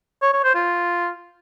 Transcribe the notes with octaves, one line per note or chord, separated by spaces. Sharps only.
C#5
C#5
C5
F4